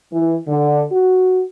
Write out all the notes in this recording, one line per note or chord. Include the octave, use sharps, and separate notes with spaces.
E3
D3
F#4